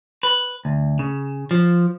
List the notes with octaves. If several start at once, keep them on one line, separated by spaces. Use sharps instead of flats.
B4
D2
C#3
F3